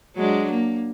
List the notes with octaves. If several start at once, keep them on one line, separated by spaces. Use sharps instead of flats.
F#3 G#3 D4
A#3